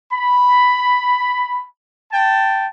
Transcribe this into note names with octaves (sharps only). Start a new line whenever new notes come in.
B5
G5 A5